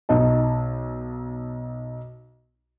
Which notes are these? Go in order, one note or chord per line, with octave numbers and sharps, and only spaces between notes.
B1 D#4 D#5 A5